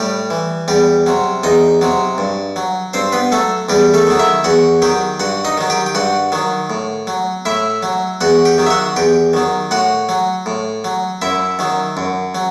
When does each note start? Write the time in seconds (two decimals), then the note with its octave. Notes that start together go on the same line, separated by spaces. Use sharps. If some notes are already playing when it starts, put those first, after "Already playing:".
Already playing: A2 G3 G4
0.30 E3
0.68 E2 G3 G4
1.06 C3 F#3
1.43 E2 D#4 D#5
1.81 C3 F#3
2.18 G2
2.56 F#3
2.93 G2 C4 C5
3.12 B3 B4
3.32 F#3 A3 A4
3.69 E2 G3 G4
3.94 A3 A4
4.07 D#3 F#3
4.19 E4 E5
4.44 E2 F#4 F#5
4.82 D#3 F#3 G4 G5
5.20 G2 F#4 F#5
5.45 D#4 D#5
5.57 D#3 F#3
5.70 G4 G5
5.86 G5
5.95 G2 F#4 F#5
6.32 D#3 F#3
6.70 A2
7.07 F#3
7.45 A2 E4 E5
7.83 F#3
8.21 E2 F#4 F#5
8.45 G4 G5
8.58 D#3 F#3
8.66 E5
8.70 F#4 F#5
8.96 E2 G4 G5
9.33 D#3 F#3
9.71 A2 F#4 F#5
10.09 F#3
10.46 A2
10.84 F#3
11.22 F#2 E4 E5
11.59 D#3 F#3
11.97 F#2
12.35 F#3